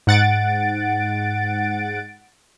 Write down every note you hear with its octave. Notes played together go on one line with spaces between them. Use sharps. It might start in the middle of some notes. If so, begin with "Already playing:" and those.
G#2 F#5 A6 D7